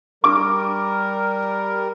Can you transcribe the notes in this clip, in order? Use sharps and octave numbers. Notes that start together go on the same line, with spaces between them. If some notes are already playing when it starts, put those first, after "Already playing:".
G3 A#4 D6